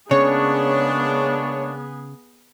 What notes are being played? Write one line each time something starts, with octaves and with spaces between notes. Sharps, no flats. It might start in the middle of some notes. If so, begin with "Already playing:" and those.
C#3 G#3 A#3 B3 D4 G#4 C#5